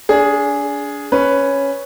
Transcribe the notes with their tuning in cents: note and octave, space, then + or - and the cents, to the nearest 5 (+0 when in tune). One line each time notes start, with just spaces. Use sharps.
D4 -30 G#4 +0
C#4 +0 B4 +5